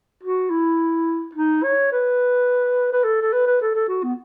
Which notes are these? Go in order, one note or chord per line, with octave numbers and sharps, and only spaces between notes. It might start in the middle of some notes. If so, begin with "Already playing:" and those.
F#4
E4
D#4
C#5
B4
B4
A4
A4
B4
B4
A4
A4
F#4
B3